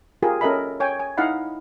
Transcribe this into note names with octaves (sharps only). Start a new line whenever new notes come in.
F4 G4 G#4 A#4
C#4 A4 A#4 D#5 E5 B5
C#5 G5 G#5
G#5
D#4 E4 D#5 F5 F#5 B5